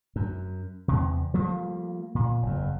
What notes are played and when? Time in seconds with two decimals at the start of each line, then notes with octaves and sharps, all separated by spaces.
0.16 F#2
0.88 E2 C3
1.34 F3 G3 A3 A#3
2.15 A#2
2.43 F#1 E2